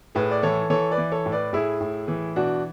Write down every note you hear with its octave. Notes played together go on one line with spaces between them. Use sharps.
A2 G#4 B4
D5
E3 A4 C#5
E3 A4 C#5
B4 D5
E3
A4 C#5
A2
B4 D5
A2 E4 G#4
A2
E3
B2 D4 F#4